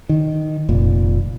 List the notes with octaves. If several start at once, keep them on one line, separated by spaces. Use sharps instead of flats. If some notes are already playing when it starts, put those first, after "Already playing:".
D#3
F1 A#2